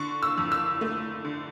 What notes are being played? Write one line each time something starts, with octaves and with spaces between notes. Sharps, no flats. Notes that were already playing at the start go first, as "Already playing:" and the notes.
Already playing: D3 C#6
E6
F2
E6
A3
D3